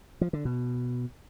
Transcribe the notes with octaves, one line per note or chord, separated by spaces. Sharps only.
F3
D3
B2